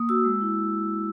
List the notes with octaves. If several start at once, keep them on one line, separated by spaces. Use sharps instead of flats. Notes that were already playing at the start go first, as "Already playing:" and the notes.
Already playing: A#3 D#6
F#4 E6
G#3
E4